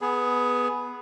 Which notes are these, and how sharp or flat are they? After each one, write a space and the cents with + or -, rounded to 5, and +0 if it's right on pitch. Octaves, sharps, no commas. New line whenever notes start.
B3 +0 G#4 +10